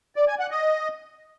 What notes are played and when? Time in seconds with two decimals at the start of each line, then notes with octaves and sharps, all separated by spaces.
0.16 D5
0.28 G#5
0.39 F#5
0.51 D#5